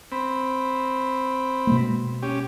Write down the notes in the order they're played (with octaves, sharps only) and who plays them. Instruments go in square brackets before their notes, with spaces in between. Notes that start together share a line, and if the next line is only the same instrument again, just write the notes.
[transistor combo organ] C4 B5
[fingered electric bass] B2 G#3 A#3
[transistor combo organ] C#4 G4